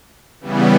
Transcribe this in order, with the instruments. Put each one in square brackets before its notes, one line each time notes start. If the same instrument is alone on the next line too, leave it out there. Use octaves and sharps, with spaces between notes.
[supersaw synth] C#3 E3 G3 B3